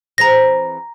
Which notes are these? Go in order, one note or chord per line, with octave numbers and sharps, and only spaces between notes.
E3 C4 G#4 A#5 A#6